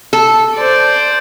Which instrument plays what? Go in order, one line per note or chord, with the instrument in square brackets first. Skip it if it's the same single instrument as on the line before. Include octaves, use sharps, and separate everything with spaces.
[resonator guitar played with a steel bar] A4
[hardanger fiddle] C5 D5